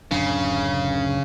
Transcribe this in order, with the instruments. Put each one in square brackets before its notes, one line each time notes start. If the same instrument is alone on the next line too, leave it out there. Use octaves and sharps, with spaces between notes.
[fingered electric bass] D1 F#2 D4 [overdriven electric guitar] C#3